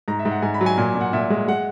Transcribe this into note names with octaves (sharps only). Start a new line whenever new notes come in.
G#2 A#5
E5
G#2
F#5
G#2 G#5
B5
F#3
G#5
A#2 G#5
A#2
F#5
A#2 E5
G#3
G#3 F#5